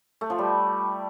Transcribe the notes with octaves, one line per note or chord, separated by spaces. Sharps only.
A3
F3
G3